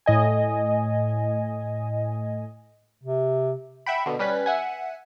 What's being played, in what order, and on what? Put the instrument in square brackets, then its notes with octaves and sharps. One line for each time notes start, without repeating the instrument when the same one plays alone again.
[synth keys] A2 D#5 G#5
[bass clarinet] C3
[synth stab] E5 F#5 G5 B5
B2 D3
G3 C#4 B4 B6
E5 F#5 G#5